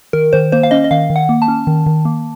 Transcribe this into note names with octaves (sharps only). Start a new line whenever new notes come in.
D#3 A#4
D#3 C5
A#3 C5
F5
C#4 D#5
D#5
D#3 F5
D#3
F#5
A#3
A5
C#4
D#3
D#3
A#3